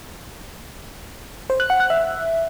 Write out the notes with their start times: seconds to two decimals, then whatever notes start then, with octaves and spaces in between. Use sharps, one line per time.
1.50 C5
1.60 F#6
1.70 F#5
1.80 F#6
1.90 E5